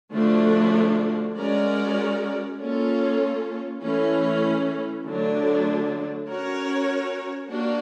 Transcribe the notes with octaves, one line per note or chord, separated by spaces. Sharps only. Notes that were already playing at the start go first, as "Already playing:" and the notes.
D3 F3 A3 D4 F#4
G#3 C#4 F#4 A#4 D5
A#3 C#4 F4 A4
E3 A3 C#4
D3 F#3 A3 D4
C#4 F#4 A#4 C#5
A#3 D4 F#4